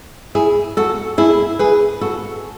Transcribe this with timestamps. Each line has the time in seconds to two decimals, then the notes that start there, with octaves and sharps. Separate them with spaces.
0.35 E4 G#4
0.77 F#4 A4
1.18 E4 G#4
1.59 G#4 B4
2.01 F#4 A4